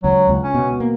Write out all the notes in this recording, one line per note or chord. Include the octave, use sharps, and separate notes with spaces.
C#2 F#3
C#2
C#4
B2
A#3